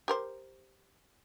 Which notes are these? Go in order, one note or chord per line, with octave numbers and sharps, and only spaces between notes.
G4 A#4 C5